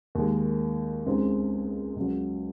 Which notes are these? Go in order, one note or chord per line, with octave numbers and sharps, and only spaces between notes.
D#2 D#3 G#3
C#2 C#3 G#3 C4 D#4
C#2 C#3 F#3